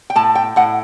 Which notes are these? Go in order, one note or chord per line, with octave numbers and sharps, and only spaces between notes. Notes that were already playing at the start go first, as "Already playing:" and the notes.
G5
A2 A5
G5
A2 F#5